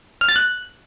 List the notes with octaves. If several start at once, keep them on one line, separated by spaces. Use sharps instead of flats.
F6
A6
F#6